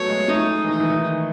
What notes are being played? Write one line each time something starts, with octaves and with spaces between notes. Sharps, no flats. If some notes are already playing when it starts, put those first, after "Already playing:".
Already playing: F#3 A3 B3 C#5
G#3
A3 D#4
G#3
E3
D#3 D#4
E3
D#3